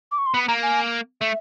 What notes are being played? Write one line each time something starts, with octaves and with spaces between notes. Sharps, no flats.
D6
C#6
C6
B3 B5
A#3 A#5
G#5
A3 E5